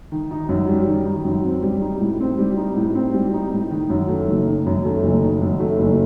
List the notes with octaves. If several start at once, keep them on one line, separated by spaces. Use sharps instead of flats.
D#3
D#4
F#2
G3
D#3
D#4
F#2
C4
G3
D#4
A2
C4
G3
D#4
A2
C4
G3
D#4
A2
D#3
F#2
A3
F#1
D#3
F#2
A3
F#1
D#3
F#2
A3
F#1